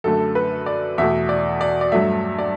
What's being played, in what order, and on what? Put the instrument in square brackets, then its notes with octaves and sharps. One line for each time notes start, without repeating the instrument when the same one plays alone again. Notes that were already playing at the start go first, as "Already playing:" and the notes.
[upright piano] F#2 D3 A3 A4
B4
D5
E2 B2 A3 E5
D5
D5
D5
G2 F#3 A3 E5
D5